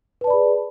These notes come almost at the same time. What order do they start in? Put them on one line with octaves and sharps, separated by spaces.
B4 A5 D5 B5 G#4